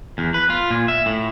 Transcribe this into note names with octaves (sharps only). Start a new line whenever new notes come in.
E2
B4
F4
A#2
E5
A2